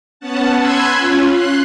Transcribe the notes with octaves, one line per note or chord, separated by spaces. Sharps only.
B3 C#4 F#5 A5
G#5 B5 C6 E6 F#6 G#6
C#4 F4
C6 F#6 C7